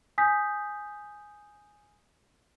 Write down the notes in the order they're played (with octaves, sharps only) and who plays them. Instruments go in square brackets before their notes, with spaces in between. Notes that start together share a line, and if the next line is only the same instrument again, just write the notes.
[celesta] G#5 D#6 G6 B6